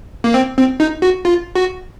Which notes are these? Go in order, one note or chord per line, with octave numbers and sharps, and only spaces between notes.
A#3
C4
C4
D#4
F#4
F4
F#4